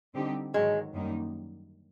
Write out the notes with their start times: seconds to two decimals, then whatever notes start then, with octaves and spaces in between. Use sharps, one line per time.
0.14 D3 G3 C4 D#4 G4
0.54 G#2 D#3 F#3 G#3
0.94 F#2 D#3 G3 A#3 D#4